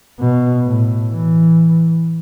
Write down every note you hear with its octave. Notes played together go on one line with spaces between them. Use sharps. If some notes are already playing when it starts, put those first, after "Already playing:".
B2
A2
E3